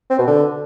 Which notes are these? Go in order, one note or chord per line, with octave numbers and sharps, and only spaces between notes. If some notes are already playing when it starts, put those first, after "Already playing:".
C4
B2
D3